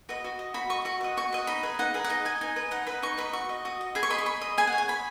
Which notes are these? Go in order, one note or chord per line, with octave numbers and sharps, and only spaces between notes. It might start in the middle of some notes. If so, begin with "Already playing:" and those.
F#4 B4 D#5
F#4
D#5
F#4 B5
D#5 C#6
F#4 C#6
B4 D#5
F#4 C#6
B4 D#5
D#4 B5
G#4 B4
D#4 F#5
G#4 B4
F#5
D#4 D#5
B4 D#5 G#5
D#4 G#5
B4 D#5
D#4 F#5
B4 D#5 B5
D#4 C#6
B4 D#5 B5
F#4 C#6
D#5
F#4 D#6
D#5
G#4 B5
C#6
D#5 B5
C#6
G#4 B5
D#5
G#4 G#5
F#5
C#5
G#5
G#4 B5